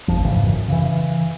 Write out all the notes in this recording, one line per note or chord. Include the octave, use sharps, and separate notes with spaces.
D#1 G#1 F2 F3
D1 G#2 C#3 E3
F#2
C#3 E3